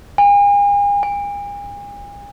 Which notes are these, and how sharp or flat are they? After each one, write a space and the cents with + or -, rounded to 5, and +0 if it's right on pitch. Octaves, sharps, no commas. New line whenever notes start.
G#5 -40
G#5 -40